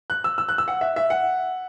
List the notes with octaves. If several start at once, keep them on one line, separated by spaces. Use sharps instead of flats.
F#6
E6
E6
F#6
E6
F#5
E5
E5
F#5